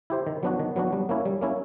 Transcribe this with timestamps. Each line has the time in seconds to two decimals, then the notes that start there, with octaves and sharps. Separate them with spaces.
0.10 E4 G4 C5
0.27 D#3
0.43 F#3 B3 D4 F#4
0.60 D#3
0.76 F#3 B3 D4 F#4
0.93 G3
1.09 A#3 C#4 E4
1.25 G3
1.41 A#3 C#4 E4